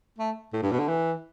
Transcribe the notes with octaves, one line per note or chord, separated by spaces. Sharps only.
A3
A2
G2
B2
D3
E3